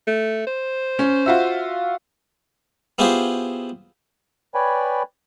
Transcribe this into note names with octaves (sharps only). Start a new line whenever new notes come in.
A3
C5
C#4
F4 F#4 E5
B3 E4 F4 G4 G#4 C5
B4 C#5 D5 G5 G#5 B5